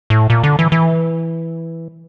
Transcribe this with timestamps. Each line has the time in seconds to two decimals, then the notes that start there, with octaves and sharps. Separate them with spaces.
0.10 A2
0.30 A#2
0.43 D3
0.59 E3
0.72 E3